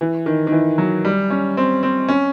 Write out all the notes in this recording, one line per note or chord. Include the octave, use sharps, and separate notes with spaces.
E3
D#3
D#3
E3
F#3
G3
C#4
C4
C4
C#4